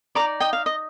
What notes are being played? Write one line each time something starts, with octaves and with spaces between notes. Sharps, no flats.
D#4 A#4 D5 A#5 D6
D#5 G5
F5
D#5